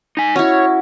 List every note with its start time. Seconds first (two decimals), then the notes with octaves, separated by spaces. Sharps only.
0.17 D#4 G#5
0.36 C#4 E4 F#4 C#5